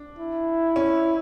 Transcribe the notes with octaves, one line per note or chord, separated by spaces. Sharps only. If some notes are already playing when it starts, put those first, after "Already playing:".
Already playing: D4
E4
C#4